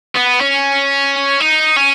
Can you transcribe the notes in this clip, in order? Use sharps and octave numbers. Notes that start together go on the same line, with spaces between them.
B3
C#4
D#4
C#4